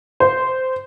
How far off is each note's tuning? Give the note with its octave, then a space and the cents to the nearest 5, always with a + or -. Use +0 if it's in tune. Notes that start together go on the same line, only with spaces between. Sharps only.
C5 -10